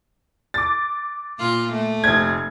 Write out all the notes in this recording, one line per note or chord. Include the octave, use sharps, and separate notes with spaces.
D6 A6
A#2 F4
A3
F1 C4 G#6